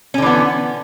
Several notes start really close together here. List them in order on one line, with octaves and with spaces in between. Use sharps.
C#4 D3 E3 B3